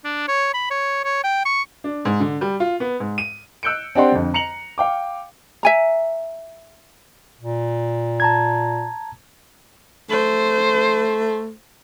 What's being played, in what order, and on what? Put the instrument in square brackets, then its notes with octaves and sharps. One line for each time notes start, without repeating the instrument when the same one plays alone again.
[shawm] D4
C#5
B5
C#5
C#5
G5
C#6
[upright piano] D4
G#2
D3
G3
F4
B3
G#2
D#7
E6 F#6 G6 C#7 D7
C4 D4 G4 D5 F#5 C6
F2 D3
A#5 C#7 F7 F#7
F5 G5 D6
[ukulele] E5 G#5 A#5
[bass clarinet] A#2
[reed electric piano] A5 A#5 G#6
[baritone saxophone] A3 [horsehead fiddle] C5